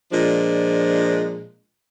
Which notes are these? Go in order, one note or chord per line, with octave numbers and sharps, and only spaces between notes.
A#2 F3 G#3 D4